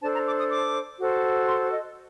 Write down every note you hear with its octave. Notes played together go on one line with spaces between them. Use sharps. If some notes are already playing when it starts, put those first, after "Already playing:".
D4 A4 C5 A5
A#5
D6
D#6
D6
F#4 A4 C5
C6
D#5